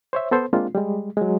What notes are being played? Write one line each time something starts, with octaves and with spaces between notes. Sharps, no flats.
C5 C#5 E5
B3 A4 C5
G#3 A#3 C4 D4 F4
G3 G#3
F#3 G#3